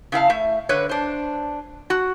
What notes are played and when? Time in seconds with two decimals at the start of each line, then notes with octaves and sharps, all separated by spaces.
0.12 C#3 E4 F5 A5
0.30 A3 E5
0.69 D3 B4 C#5
0.89 D4 C5
1.90 F#4